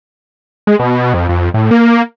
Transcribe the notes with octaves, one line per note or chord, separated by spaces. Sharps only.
G#3
B2
F2
F2
A2
A#3